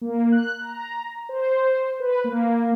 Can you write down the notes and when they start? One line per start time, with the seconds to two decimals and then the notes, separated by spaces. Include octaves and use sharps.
0.01 A#3
0.32 F#6
0.61 A#5
1.29 C5
2.00 B4
2.24 A#3